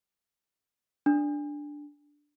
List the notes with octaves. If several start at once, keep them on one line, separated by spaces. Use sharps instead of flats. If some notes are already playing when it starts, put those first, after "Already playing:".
D4